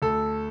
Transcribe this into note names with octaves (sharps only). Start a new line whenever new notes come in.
D2 A4